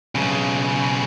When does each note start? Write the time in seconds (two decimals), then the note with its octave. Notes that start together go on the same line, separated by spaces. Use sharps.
0.15 B1 C#3